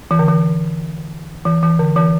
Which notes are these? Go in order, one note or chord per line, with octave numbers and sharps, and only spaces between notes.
E3
D3
E3
E3
E3
D3
E3